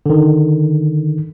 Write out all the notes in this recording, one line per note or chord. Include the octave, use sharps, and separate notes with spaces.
D3 D#3